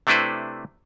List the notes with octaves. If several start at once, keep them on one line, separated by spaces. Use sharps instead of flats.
C3 A3 D4 E4 B4 C5